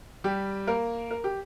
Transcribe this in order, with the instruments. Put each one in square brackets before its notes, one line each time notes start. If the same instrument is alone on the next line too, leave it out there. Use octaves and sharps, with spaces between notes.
[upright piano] G3 G4
A#3 A#4
A#4
G4